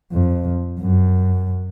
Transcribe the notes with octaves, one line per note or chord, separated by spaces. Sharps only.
F2
F#2